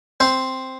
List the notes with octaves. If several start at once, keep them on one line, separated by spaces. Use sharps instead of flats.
C4 C5